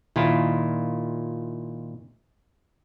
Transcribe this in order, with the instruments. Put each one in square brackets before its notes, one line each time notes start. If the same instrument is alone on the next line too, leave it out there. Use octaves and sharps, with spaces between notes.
[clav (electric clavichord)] A#2 D#3 E4 F4